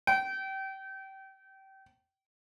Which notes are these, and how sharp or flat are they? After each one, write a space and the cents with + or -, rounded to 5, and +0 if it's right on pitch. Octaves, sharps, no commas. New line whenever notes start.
G5 -25